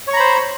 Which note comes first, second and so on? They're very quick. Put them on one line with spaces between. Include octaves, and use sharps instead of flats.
C#5 C#6 A#5 B5 C5